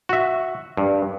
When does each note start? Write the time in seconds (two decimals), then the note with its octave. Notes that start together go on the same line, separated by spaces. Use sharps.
0.09 F#4 E5
0.77 G2